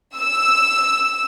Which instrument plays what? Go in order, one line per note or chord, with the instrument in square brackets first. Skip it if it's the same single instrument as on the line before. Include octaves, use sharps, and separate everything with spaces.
[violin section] E6